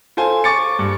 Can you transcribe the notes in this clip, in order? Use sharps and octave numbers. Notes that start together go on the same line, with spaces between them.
F4 A4 C5 G#5
C#6 D6 A6 C#7
G2